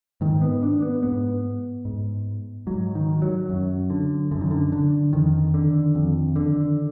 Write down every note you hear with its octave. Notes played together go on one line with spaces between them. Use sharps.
G#2 D#3
B3
D4
B3
G#2 B3
G#2
G#2 F#3
D#3
F#3
F#2
D3
F#2 D3
D#3
D3
D3
F2 D#3
D3
F2
D3